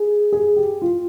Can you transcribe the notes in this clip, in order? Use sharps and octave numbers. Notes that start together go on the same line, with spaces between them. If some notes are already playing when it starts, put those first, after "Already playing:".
Already playing: G#4
G#4
G4
F4